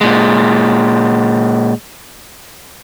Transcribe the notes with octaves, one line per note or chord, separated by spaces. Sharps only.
A#2 G#3